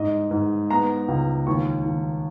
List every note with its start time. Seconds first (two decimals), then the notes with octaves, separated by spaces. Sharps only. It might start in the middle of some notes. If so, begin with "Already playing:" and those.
Already playing: G#2 D#5
0.31 G#2
0.70 B3 A#5
1.08 C#2
1.47 D#2 C#6
1.85 D#2